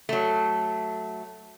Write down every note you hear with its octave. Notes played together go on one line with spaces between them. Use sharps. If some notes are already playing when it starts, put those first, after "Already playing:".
F#3 A3